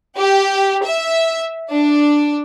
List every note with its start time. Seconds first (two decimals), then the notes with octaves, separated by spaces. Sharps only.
0.18 G4
0.85 E5
1.71 D4